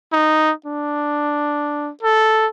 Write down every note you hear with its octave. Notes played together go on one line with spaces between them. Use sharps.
D#4
D4
A4